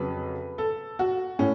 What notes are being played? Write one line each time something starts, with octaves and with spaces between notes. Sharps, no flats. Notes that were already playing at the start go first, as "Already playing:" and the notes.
Already playing: F2 C#3 F#3 B4
A4
F#4
A2 C#4